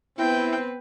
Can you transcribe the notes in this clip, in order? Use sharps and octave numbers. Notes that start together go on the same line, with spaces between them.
B3 C4 E4 B4 G5